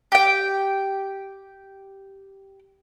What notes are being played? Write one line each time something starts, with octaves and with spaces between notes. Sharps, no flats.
G4 G5